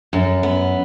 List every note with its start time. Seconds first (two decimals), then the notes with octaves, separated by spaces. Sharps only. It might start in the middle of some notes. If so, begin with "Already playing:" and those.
0.13 F#2
0.43 B3